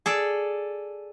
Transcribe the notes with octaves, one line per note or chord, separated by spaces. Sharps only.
G#4 A4 D5